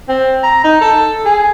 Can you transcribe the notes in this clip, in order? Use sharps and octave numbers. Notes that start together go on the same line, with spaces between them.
C4
A#5
D#4
A4
G#4